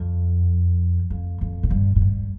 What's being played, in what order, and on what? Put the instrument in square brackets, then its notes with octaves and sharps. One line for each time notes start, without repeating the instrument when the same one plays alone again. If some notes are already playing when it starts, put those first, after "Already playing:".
Already playing: [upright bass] F2
F2
F2
A2
G2
A2
G2